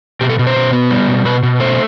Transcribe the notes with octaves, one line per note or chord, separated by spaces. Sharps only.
B2 G4
A4
B2
C5
B2
B3
G3
B2
B2 B4
B2
A3 C5